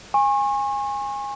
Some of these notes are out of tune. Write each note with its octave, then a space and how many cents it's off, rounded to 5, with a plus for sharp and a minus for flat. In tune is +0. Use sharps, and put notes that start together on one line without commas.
G#5 -20 C#6 -35